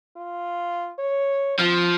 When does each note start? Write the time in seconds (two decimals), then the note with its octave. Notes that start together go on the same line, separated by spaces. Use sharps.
0.17 F4
0.99 C#5
1.59 F3 C4